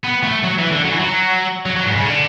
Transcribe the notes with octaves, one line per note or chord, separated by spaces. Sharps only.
B3
A3
F#3
E3
D3
F#3
E3
F#3
F#3
F#3
G#2
C#3
D3